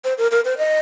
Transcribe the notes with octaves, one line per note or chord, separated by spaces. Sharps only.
C5
A#4
A#4
C5
D#5